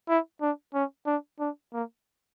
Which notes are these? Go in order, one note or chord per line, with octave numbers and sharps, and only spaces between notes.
E4
D4
C#4
D4
D4
A#3